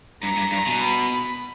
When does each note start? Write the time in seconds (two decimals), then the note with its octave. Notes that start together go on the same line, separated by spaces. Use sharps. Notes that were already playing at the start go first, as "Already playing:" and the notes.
0.23 G2 A#5
0.37 G2
0.52 G2
0.67 B2
0.81 B5